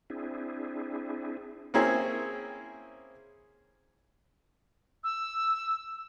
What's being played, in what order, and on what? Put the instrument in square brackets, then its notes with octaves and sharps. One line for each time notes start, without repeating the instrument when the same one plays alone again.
[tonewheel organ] C4 D4 E4 G#4
[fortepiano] A#3 C4 C#4 E4 G#4
[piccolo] E6